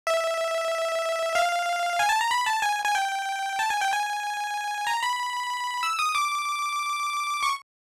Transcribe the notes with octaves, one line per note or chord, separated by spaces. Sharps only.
E5
F5
G#5
A5
A#5
B5
A5
G#5
G#5
G5
A5
G#5
G5
G#5
A#5
B5
E6
D#6
D6
C#6